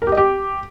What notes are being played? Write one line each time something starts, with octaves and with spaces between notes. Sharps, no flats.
A#4
G4
D#5
G4